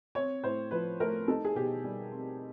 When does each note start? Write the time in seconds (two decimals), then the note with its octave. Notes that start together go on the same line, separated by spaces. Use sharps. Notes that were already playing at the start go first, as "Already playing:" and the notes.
0.15 C4 C#5
0.44 A2 C5
0.71 F3 B4
1.00 A3 A#4
1.28 D#4 A4
1.45 G#4
1.55 B2 G4
1.84 G3
2.12 C4